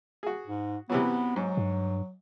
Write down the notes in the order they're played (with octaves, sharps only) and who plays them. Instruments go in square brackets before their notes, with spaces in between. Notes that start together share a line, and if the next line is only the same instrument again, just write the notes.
[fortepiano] F#4 G#4
[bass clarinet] G#2
[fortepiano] C3 E3 F#3 [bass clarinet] B3
[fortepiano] G#2 [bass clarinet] F#3
[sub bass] G2